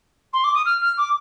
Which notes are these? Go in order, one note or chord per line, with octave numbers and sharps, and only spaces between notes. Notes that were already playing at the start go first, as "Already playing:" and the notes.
C6
D6
D#6
F6
F6
D6